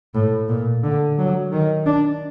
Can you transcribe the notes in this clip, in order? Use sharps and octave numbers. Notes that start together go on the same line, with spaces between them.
A2
A#2
D3
F#3
D#3
D4